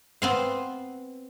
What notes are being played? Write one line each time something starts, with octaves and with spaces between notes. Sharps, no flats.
B3 C4 F5